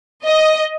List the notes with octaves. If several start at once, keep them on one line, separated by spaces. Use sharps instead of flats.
D#5